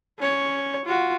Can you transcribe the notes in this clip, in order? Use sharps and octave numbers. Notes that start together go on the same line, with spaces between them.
C#4 C#5
F4 F#4